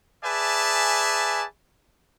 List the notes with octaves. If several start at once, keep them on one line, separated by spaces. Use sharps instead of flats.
G#4 B4 D5 E5 G#5 A5